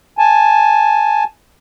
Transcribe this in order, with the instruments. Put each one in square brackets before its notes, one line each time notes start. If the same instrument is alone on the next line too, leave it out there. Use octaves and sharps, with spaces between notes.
[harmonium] G#5 A5